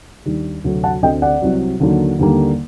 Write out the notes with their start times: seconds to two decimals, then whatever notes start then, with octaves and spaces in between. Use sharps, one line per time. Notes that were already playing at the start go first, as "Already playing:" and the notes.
0.25 D#2 D#3 G3 D4
0.64 D2 C3 F#3 A3
0.84 F#5 A5
1.02 D2 D3 A3 C4 D#5 G5
1.22 D5 F#5
1.42 C2 C3 F#3
1.80 D#2 D3 F#3 A#3
2.19 D#2 D3 G3 A#3